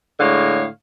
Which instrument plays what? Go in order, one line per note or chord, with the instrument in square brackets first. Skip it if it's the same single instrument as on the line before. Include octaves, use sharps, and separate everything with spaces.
[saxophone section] A2 D3 G#3 C#5 F5